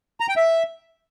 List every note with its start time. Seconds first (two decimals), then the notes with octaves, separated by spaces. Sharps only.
0.20 A#5
0.29 G5
0.37 E5